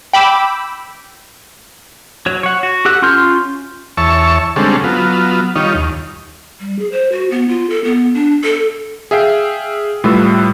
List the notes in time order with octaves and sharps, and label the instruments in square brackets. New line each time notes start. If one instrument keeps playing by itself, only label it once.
[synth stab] G5 B5 D6 E6
[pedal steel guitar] F#3 C#5
C#5 F#5
F#4
G4 A4 F#5 F#6
C#4 F4 C6 F6 G6
[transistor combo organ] E2 C#5 E5 A5 C#6
D3 G3 G#3 C4 C#4 A4
F#3 B3 F4
D#3 G3 D#4 F4 C#5
D#2
[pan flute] G3
G#4
C5
F#4
B3
F4
A4
B3
D4
A4
[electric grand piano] G#4 E5 F5 G5
A2 G3 F4 B4 E6